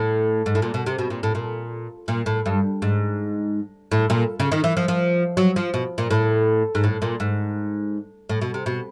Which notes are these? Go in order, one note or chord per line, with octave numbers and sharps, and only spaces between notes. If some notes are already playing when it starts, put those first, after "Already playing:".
Already playing: A2
G#2
A2
A#2
B2
C3
B2
A#2
A2
A#2
A#2
A2
G2
G#2
A2
A#2
C#3
D#3
E3
F3
F3
F#3
F3
B2
A#2
A2
G#2
A2
A#2
G#2
A2
B2
C3
B2